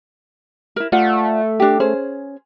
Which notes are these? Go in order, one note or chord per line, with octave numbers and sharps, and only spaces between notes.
E4 A#4
A3 F4 D5 F#5
D4 G4
C#4 G#4 C5